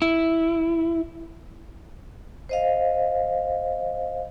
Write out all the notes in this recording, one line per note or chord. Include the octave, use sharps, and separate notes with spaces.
E4
C5 D#5 F5